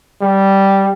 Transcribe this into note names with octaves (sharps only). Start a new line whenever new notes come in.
G3